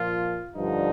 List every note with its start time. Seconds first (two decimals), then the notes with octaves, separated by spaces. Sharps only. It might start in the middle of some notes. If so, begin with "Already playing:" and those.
Already playing: A#2 F3 F4
0.56 G2 D3 F3 D#4